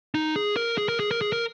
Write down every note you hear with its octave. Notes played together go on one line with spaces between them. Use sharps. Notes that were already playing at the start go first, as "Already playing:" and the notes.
D#4
G#4
A#4
G#4
A#4
G#4
A#4
G#4
A#4